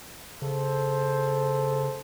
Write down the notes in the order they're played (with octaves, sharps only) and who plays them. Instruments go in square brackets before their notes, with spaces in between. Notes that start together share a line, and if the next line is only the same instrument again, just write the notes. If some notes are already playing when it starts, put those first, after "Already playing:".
[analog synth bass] C#3 [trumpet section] A4 C5